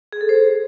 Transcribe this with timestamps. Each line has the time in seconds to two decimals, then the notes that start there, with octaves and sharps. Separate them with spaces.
0.13 G#4
0.21 A4
0.29 C5